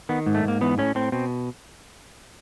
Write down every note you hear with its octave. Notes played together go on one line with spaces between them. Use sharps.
D#3 B3
G#2
A3
G#2 A#3
E3 B3
A2 C#4
A2 C4
B2 C4